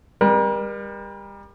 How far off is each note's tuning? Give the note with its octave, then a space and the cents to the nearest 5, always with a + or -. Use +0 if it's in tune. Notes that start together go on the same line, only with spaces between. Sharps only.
G3 +35 A#4 +40